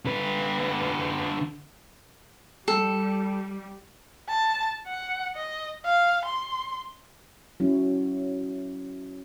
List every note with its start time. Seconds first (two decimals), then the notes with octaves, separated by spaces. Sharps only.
0.05 D3 B4
2.68 G3 A4
4.28 A5
4.87 F#5
5.35 D#5
5.85 F5
6.25 C6
7.60 F#3 C#4 E4